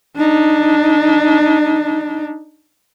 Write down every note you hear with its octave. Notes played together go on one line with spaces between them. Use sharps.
D4 D#4